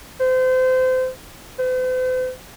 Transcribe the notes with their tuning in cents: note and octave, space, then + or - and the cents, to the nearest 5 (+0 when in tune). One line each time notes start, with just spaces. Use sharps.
C5 -30
C5 -45